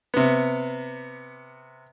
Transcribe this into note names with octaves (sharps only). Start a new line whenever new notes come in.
C3 B3